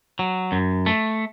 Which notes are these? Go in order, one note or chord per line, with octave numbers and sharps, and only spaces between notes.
F#3
F#2
A3